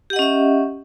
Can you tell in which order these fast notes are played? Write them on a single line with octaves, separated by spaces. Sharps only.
G4 F#5 D#5 C#4 E5